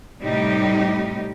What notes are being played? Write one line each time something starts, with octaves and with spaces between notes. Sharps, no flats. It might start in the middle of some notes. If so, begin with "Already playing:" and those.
A2 C3 G3 D#4 G4